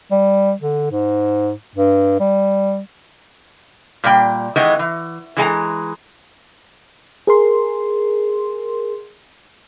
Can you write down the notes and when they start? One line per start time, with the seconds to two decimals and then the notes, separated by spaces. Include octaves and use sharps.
0.11 G3
0.62 D3
0.91 G#2
1.75 G2
2.20 G3
4.04 A#2 G3 G5
4.56 D#3 E3 G#3 B3 D#5
4.79 E3
5.37 E3 G#3 G#5 A#5
7.27 G#4 A#4 C6